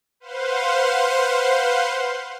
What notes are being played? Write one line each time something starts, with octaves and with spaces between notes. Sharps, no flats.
B4 C5 F5 F#5 C6